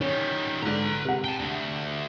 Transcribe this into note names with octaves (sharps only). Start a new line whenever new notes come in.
D#3 G3 C#4
G#2 D3 B4 A#5
C3 F#5
G5 A5
D2